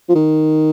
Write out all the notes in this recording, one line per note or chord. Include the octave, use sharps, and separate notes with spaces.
F3
D#3